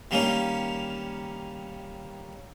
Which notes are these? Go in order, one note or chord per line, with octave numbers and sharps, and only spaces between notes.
D#3 G3 A#3 C#4 D#4